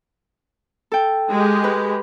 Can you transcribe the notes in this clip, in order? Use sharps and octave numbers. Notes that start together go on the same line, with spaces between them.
A4 G5
G#3 G4
B4